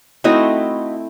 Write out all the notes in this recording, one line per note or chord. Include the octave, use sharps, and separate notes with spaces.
A3 C4 D#4 E4 F#4 D#5